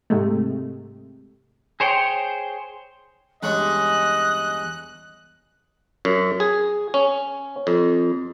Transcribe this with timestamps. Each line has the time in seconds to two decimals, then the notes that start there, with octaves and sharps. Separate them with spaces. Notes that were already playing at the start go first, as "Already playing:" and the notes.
0.10 G#2 C3 G#3 A3
1.80 G#4 C5 C#5 G5
3.43 E2 G2 G#3 C#4 D#5 F#6
6.05 F#2
6.40 G#4
6.94 C#4
7.67 F2